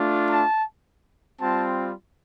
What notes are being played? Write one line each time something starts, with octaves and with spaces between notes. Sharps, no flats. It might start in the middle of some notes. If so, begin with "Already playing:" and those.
Already playing: A3 D4 F4
A5
G3 C4 F4 A5